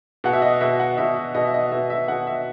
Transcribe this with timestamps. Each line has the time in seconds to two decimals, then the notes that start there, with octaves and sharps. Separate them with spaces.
0.24 B2 F#5
0.33 E5
0.42 D#5
0.61 B2 E5
0.80 F#5
0.97 B2 E5
1.35 B2 D#5
1.45 E5
1.54 D#5
1.71 B2 E5
1.90 E5
2.08 B2 F#5
2.27 E5